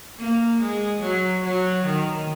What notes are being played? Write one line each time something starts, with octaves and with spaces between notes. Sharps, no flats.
A#3
G#3
F#3
F#3
D#3